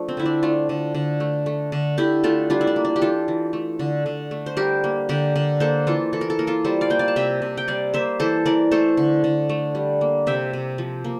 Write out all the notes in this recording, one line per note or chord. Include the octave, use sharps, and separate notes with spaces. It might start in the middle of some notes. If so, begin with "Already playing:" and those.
Already playing: F3 A3 D4
C4
D3 E4
D4
A3 D4 F4
D3
D3
A3
A3
D3
D3 E4 G4
A3 F4 A4
G3 D4 F4
E4
D4
A#3
D4
G4
E3 F4 A4
E3
A3
D3
D3
A3
C5
G3 G4 A#4
A#3
D3 G4 A#4
D3
A#3 A4 C5
E3 F4 A4
E3 A4
A#4
A4
A#3 A#4
F4 A4
G3 A4 C5
D5 F5
A#3 G5
D5 F5
A5
C3 E5 G5
C3
G5
G3 D5 F5
A#3 C5 E5
E3 A4 C5
E3 A#4 D5
A3 A4 C5
D3
D3
A3
G3
A#3
C3 E5 G5
C3
F3
A#3